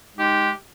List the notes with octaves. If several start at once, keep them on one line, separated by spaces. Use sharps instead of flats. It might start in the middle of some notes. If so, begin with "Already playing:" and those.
G#3 D#4 G4